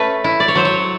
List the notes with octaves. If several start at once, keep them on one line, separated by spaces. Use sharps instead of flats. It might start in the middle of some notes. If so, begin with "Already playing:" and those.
Already playing: A3 C#4 B4
E4
D5
C#5
F#3 C5
C#5